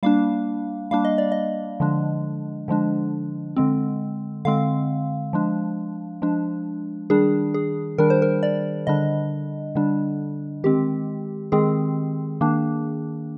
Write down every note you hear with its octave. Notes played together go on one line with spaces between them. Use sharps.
G3 A#3 D4 F5
G3 A#3 D4 F5
D#5
D5
D#5
D3 F3 G#3 D4
D3 F3 G#3 D4
D3 G#3 C4
D3 G#3 C4 F5
F3 G#3 D4
F3 G#3 D4
D#3 G3 D4 G#4
G#4
D#3 G3 D4 A#4
C5
A#4
D5
D3 G3 D4 D#5
D3 G3 D4
D#3 G#3 C4 G4
D#3 G#3 C4 G#4
D#3 A#3 D4